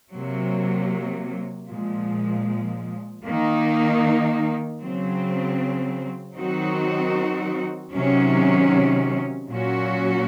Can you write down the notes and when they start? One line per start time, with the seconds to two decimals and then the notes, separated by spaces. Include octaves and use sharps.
0.13 C3 F#3 A#3
1.70 A#2 F3 G#3
3.26 D#3 A#3 D#4
4.81 C#3 F#3 C4
6.37 D#3 F#3 C4 D#4 F#4
7.92 C3 D#3 F#3 C#4
9.49 A#2 F#3 C#4 F#4